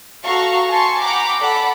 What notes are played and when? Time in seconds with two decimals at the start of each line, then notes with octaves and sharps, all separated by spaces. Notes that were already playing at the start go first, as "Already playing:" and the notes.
0.23 F#4 A4 F5 A#5 C#6
0.69 G#5 A5 C6 C#6
1.02 F#5 G5 A#5 B5 D6
1.40 A4 D5 F#5 B5